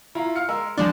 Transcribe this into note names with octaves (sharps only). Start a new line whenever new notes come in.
E4 F4 A#5
F5 F6 C#7
G#3 A#4 E6
F3 G#3 D4 D5